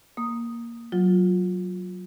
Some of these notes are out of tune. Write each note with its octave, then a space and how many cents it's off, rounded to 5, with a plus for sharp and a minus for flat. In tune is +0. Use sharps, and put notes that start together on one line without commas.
A#3 +0 D#6 +0
F#3 +0 F4 +20